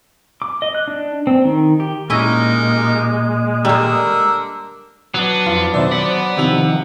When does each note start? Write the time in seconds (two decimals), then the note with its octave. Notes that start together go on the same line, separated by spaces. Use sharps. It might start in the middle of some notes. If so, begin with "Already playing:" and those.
0.42 D6
0.62 D#5
0.75 F#6
0.88 D4
1.27 C4
1.44 D#3
1.80 G4
2.10 A#2 G#3 A#3 C#4 D#4 E4 G4 D#5
3.65 D3 G3 A#3 A#4 E6
5.14 F#3 B3 D4
5.46 F2 F4 C6
5.74 B2 D#3 B3 C5 D5 E5
5.91 F#5 B5 D6
6.37 C3 D#3 F3 F7